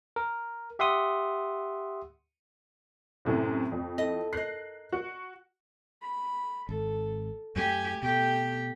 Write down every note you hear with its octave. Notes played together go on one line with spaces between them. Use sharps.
A#4
G4 E5 F#5 C6 D#6
F#2 A2 C3
F2
E4 A4 D#5
A#4 D#5 F#6 C7
F#4
B5
G#1 A4
F#2 A3 G4 G#5
B2 A3 G4 G5